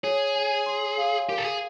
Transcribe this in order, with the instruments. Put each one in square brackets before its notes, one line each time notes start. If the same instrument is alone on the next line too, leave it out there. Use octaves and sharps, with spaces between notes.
[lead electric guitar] G#4 [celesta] C#5
[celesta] G#5
C6
F5
[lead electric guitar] G4 [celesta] A#4
[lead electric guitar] A4
G#4